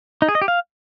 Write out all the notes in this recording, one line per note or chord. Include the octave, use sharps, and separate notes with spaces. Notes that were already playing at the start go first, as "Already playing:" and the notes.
D#4
G#4
D#5
G4
F5